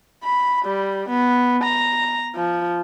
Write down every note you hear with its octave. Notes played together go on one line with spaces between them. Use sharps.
B5
G3
B3
A#5
F3